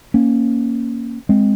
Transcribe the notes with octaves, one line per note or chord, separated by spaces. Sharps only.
A#3 C#4
G#3 C4